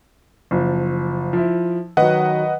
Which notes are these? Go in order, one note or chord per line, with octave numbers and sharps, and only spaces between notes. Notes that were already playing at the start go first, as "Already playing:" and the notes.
F#1 F3
F3 E4
D#3 F#3 B4 D#5 F#5